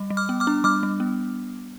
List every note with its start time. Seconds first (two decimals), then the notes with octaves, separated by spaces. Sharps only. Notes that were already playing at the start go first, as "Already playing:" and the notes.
Already playing: G3
0.10 G3
0.17 D6 F6
0.29 B3
0.40 D6 F6
0.47 D4
0.64 G3 D6 F6
0.83 G3
1.00 B3